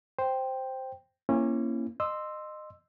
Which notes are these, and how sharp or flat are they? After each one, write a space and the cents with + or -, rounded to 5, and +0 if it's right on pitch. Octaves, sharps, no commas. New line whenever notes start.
C5 +0 G5 +0
A#3 +0 C#4 -25 E4 +25
D#5 -25 C6 +0 E6 +0